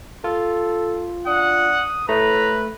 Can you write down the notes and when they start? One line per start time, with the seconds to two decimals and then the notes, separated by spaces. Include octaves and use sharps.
0.24 F4 A4
1.27 D4 F#5 D#6
2.09 A2 A3 B4 A#5